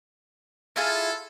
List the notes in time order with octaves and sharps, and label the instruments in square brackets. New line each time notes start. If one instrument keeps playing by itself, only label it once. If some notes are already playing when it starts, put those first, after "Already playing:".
[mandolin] E4 F4 G#4 [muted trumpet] A4